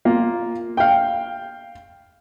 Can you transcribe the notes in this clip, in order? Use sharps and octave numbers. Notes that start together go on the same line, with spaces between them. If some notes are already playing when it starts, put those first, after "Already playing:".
A#3 F4
F5 G5